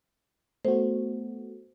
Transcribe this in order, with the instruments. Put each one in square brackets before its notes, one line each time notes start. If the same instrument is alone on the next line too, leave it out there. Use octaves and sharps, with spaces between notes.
[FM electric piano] A3 B3 F#4 [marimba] C5